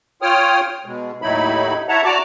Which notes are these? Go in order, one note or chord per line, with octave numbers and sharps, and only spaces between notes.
F4 C#5 G5 D#6 F6
B2 G#3
D#2 A2 F#3 D#4 E4 B5
E4 C#5 E5 F#5 A5 A#5
F#4 D5 A5 A#5 D6